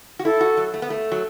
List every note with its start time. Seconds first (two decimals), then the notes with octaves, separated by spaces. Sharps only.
0.19 F#4
0.25 E4 A4
0.41 F#4
0.57 F#3
0.74 A3
0.82 B3
0.90 A3
1.12 F#3